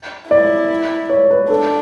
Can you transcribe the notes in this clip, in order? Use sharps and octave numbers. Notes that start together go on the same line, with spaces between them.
E4 D5
C#5
B4
D4 A4